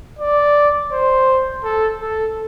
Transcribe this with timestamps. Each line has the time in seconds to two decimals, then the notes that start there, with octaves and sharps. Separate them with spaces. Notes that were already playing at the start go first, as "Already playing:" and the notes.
0.19 D5
0.92 C5
1.64 A4
2.01 A4